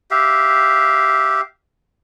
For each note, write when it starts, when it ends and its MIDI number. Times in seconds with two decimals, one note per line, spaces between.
0.11 1.41 67
0.11 1.41 76
0.11 1.41 77